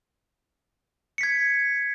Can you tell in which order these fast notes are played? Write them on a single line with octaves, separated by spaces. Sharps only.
C#7 B6 G#6